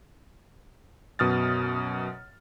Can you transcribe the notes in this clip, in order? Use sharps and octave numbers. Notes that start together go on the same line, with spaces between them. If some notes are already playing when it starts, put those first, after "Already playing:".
F#2 B2 D#6 F6 A6